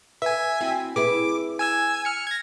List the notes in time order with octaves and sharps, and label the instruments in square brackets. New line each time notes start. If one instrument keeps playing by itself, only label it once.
[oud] B4 [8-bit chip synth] E5 G#5
[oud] C4 E4 F#4
[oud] E4 G#4 B4 [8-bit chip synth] D6
[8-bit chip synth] G#5 E6 G#6
F6 C#7
G#6 A#6